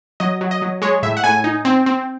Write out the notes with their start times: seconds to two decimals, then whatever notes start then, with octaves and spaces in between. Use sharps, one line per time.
0.20 F#3 D#5
0.41 F#3
0.51 D#5
0.62 F#3
0.82 G#3 C#5
1.03 A2 E5
1.17 F#5
1.24 A2 G#5
1.44 D#4
1.65 C4
1.86 C4